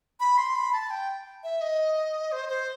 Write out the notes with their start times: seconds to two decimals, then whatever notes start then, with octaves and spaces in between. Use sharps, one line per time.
0.20 B5
0.38 C6
0.55 B5
0.73 A5
0.90 G5
1.43 E5
1.61 D#5
2.32 C5
2.49 C5